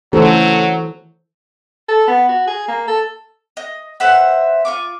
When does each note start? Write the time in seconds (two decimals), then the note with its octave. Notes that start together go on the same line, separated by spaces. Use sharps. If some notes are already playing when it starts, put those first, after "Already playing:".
0.13 C#3 E3 F#3 A3 A4 C5
1.88 A4
2.07 B3
2.29 F#4
2.47 G#4
2.68 A#3
2.88 A4
3.57 D#5
4.00 B4 C5 E5 F#5
4.65 F4 C#6 D6